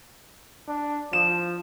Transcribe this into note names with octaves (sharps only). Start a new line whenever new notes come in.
D4
F3 E7